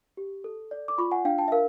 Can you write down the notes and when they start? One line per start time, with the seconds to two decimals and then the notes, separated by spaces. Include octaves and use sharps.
0.17 G4
0.44 A4
0.71 D5
0.88 D6
0.98 F4 B5 C#6
1.11 F#5 G#5
1.25 D4 F5 G5
1.38 G5 A5
1.48 E5
1.52 A#4 F5